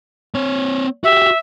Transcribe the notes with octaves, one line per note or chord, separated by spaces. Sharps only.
C4 C#5
F#4 G4 E5